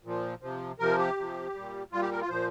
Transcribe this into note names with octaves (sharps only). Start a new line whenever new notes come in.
A#2 F3
C3 F3
C3 F3 A#4
G4
C3 F3
A#2 G3
A#2 G3 F4
G4
A#4
F4
A#2 F3 C5